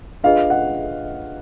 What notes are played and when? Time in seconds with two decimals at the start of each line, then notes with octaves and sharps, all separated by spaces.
0.24 D4 F4 G#4 B4 D#5 F5
0.50 F#5